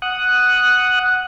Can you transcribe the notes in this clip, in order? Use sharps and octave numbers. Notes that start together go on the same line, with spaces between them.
F#5 D#6 F#6